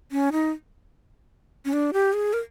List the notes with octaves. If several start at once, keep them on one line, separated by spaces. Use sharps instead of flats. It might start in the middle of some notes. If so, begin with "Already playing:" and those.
C#4
D#4
C#4
D4
G4
G#4
A#4